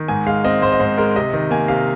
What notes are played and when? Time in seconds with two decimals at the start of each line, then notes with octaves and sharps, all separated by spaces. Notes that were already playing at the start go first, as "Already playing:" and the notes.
Already playing: D#3
0.08 G#2 G#5
0.26 G#3 F5
0.44 C4 D#5
0.62 G#2 C5
0.72 D#5
0.80 G#2 C5
0.98 G#3 A#4
1.16 C3 D#5
1.33 D#3
1.51 A#3 G#5
1.68 C3 F5